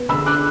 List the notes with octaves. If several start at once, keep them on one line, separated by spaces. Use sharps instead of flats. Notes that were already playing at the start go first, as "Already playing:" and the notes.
Already playing: B3
D3 B5 E6
D6 F#6